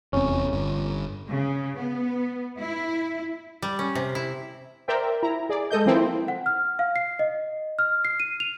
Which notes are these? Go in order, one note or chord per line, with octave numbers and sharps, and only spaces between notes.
F1 E2 C4 C#4
G1
C#3
B3
E4
G3
C#4
C3
E4
A#4 C5 D5 E5 G5
E4 A#5
G#4 D5
G#3 A4 D#5 G6
E3 F3 A#3 C4 E4 A4
F#5
F6
F5
C7
D#5
F6
C7
D#7
F7